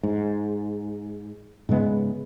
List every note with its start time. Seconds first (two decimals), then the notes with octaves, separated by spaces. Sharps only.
0.03 G#2
1.69 G#2 C#3 G#3 B3